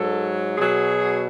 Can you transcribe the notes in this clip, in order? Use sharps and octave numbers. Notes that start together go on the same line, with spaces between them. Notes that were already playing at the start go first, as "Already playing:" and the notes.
Already playing: G#2 F#3 A4
B2 F#3 G#4